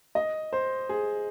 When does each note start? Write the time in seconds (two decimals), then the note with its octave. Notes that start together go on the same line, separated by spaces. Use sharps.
0.15 D#5
0.53 C5
0.89 G#4